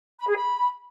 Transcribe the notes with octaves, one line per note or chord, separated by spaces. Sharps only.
B5
G#4
B5